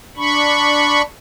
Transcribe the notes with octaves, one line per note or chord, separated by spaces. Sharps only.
D4 B5 C#6